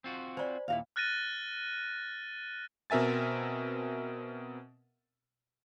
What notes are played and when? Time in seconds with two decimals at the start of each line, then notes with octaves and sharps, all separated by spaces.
0.04 C4 F4 F#4
0.37 C5 D5 G#5 B5
0.68 D#2 A#2 E4 F#4 F5
0.96 F6 F#6 A6 A#6 D#7
2.90 B2 C4 A#4 E5 G#5 A6